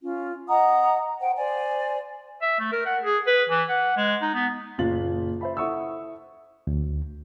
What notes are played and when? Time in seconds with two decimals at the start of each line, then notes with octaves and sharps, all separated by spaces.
0.02 C#4 F4
0.49 D#5 F#5 A#5 D#6
1.20 C5 F#5 G5
1.37 C5 D5 G#5
2.42 E5
2.60 A3
2.72 A#4
2.86 F#5
3.03 G#4
3.27 B4
3.49 E3
3.69 F#5
3.97 G#3
4.22 D#4
4.34 B3
4.78 F#1 A#2 F4 F5 A6 F#7
5.41 C5 E5 B5
5.57 E4 A4 F#5 C#6 D#6 E6
6.67 D2